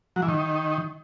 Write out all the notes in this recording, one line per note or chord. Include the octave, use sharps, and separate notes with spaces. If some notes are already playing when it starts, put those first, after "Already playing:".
F#3
E3
D#3